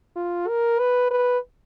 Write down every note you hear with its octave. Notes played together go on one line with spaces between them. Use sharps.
F4
A#4
B4
B4